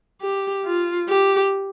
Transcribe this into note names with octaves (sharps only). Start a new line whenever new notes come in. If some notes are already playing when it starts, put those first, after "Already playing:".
G4
F4
G4